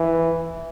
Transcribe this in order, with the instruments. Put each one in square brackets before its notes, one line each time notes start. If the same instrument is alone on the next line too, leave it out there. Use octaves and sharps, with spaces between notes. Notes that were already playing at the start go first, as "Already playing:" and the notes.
Already playing: [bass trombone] E3